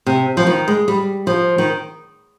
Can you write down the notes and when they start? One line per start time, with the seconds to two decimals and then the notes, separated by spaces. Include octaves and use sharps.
0.06 C3
0.37 F3
0.47 D#3
0.68 G#3
0.88 G3
1.27 F3
1.58 D#3